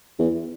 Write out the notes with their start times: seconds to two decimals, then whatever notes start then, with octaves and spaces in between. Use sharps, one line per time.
0.19 E2